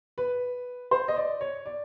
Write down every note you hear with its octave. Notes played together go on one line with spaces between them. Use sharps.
B4
C5
D#5
D5
C#5
D5